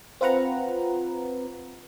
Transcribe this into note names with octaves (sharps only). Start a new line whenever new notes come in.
C4 F4 B4 F#5 A#5